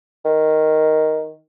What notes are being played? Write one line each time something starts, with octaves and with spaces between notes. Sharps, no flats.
D#3